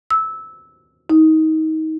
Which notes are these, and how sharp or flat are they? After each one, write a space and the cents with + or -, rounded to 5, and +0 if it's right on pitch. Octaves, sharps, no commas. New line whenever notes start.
E6 -15
D#4 +25